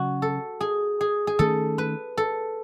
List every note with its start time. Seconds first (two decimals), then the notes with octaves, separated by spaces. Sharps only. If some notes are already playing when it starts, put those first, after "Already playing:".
Already playing: C#3 F#3 C#4 F#4
0.22 A4
0.61 G#4
1.01 G#4
1.27 G#4
1.39 D#3 A3 C#4 A4
1.78 B4
2.18 A4